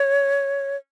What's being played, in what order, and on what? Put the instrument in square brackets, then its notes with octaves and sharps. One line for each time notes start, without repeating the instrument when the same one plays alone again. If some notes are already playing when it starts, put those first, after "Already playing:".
Already playing: [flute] C#5